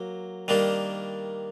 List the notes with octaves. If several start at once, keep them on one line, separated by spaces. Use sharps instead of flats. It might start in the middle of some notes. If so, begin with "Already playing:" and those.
Already playing: F#3 A#3
D#3 G3 A#3 D4